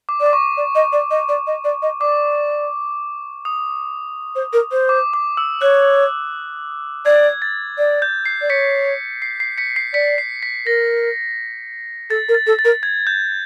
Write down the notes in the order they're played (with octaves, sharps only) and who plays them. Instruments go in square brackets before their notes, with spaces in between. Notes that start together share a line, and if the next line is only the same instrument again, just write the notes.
[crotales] D6
[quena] D5
[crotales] D6
C#6
[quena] D5
D#5
D5
D#5
D5
D#5
D5
D#5
[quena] D5 [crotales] D6
[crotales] D#6
[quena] C5
A#4
C5
[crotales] D6
D6
E6
[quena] C#5 [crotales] F#6
[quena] D5 [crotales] G#6
[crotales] A6
[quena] D5
[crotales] G6
C7
[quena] D5
[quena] C#5 [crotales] B6 C#7
[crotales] C7
C7
B6 C#7
C7
[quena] D5 [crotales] B6 C#7
[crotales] C7
B6
[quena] A#4 [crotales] A#6
[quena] A4 [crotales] A6
[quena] A#4
[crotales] A6
[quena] A4
[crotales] A6
[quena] A#4
[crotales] G#6
G6